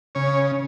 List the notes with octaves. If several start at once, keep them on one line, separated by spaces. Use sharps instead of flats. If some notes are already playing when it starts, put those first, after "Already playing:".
C#3 C#5